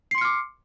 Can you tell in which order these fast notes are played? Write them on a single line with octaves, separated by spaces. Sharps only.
C7 C6 C#7 F6 D6